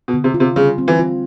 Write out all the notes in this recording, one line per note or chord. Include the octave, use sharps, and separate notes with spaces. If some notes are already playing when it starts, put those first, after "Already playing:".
B2
D3
C3
F4
C3
C#3 G3
C4
E3
F4